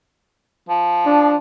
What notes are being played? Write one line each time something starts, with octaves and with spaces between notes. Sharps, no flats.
F3
D4